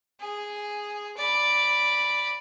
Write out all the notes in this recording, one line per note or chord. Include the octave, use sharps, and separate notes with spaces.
G#4
D5 B5